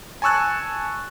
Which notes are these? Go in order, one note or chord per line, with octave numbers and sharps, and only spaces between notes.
G#5 A5 C#6 E6 F#6 A6